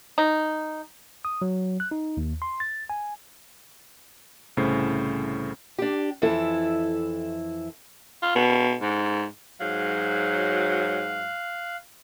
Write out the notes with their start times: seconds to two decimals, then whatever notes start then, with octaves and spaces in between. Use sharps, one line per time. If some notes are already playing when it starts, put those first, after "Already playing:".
0.18 D#4
1.25 D#6
1.42 F#3
1.80 F#6
1.91 D#4
2.17 D#2
2.42 C6
2.60 A6
2.90 G#5
4.57 C2 A2 C#3 C#4 C5 C7
5.78 D4 G4
6.22 F2 E3 E4 A4
8.22 F4
8.35 B2
8.82 G#2
9.60 G#2 F#3 F5 F#6